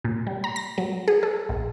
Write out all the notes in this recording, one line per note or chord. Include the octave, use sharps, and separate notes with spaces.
A#2
G3
A#5
A#6
F#3
G#4
A4
A#1